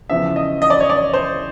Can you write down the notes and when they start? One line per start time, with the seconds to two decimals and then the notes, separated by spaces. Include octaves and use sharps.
0.10 E2 C#3 F3 E5
0.36 D#5
0.62 D#5
0.70 D5
0.80 C#5
0.90 D5
1.14 C5